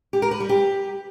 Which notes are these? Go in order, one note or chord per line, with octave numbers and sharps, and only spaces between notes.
G4
A#4
B4
G3
G4